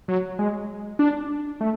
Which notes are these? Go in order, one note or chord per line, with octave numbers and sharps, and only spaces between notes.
F#3
G#3
D4
A3